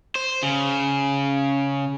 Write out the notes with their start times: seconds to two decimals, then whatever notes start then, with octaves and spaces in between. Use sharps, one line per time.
0.15 C5
0.43 C#3